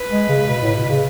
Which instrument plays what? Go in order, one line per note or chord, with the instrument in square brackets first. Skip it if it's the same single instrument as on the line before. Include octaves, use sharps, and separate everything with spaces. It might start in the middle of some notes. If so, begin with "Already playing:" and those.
Already playing: [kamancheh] B4
[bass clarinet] G#3
C#3
B2
A2
B2
C#3